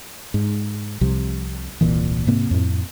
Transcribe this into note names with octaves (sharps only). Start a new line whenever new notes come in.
G#2
C2 C3 F3
D#1 C2 A#2 E3
G#2 C3 A#3 C4
F2 A2